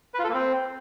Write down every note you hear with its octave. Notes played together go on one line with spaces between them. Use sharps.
B4
F4
A4
A#3
C4